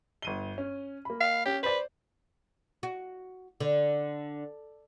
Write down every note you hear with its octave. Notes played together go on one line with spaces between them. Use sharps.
G1 D#7 G7
C#4
A#3 B5
F5
C#4 G4
B4 C5 D5
F#4
D3